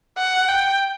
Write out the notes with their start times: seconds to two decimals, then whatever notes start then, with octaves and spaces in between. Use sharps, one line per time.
0.17 F#5
0.48 G5